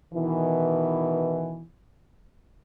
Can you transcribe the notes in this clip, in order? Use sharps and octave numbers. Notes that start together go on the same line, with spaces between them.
B2 D#3 E3